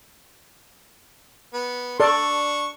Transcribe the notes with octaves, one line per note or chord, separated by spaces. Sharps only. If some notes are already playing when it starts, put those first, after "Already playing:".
B3
D4 A4 D5 C#6